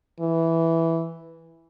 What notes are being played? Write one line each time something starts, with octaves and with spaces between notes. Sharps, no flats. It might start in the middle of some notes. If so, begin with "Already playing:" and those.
E3